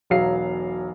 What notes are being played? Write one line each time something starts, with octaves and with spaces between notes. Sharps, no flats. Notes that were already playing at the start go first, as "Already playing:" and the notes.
E1 B1 F#3 F5 C7